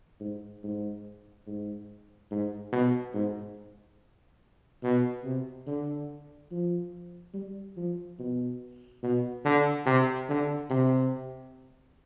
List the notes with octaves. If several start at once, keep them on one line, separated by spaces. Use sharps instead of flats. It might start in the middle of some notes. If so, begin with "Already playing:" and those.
G#2
G#2
G#2
G#2
B2
G#2
B2
C3
D3
F3
G3
F3
B2
B2
D3
C3
D3
C3